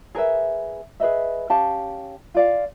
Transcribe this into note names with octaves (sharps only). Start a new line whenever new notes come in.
G#4 A#4 B4 E5
G#4 B4 D#5 E5
C#4 G4 F5 A5
F4 D5 F5